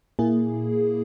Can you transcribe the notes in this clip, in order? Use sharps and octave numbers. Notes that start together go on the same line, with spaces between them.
A#2 A#3 E4 G#4